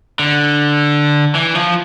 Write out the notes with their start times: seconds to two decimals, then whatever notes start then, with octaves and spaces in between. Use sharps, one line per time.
0.19 D3
1.35 E3
1.55 F3